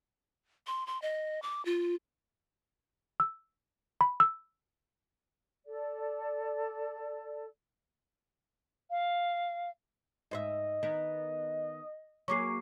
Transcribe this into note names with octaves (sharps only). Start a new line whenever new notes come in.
C6
C6
D#5
D6
F4
E6
B5
E6
A4 D5
F5
G#2 C5 D#5 E5
D#3 B3 A#4
F#3 A#3 G#4 C#5 C#6 D6 C7